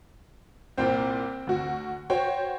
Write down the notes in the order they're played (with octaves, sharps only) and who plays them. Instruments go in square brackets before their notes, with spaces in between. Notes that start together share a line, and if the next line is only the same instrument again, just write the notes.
[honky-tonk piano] C2 A#2 [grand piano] C4 C5 G5
[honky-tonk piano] D2 F#4
[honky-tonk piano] F#4 C5 C#5 [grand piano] G5